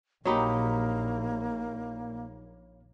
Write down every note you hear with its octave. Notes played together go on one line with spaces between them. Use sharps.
A#1 F#3 A#3 D#4 G4 C#5 B5